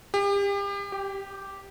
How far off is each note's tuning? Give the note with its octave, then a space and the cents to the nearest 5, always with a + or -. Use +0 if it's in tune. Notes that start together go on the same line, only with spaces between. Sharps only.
G4 +35
G4 -5